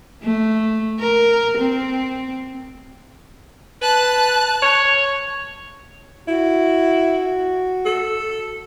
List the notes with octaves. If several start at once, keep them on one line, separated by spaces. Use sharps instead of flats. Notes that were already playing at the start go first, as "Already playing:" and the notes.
A3
A#4
C4
B4 A5 F#6
C#5
E4 F#4
A4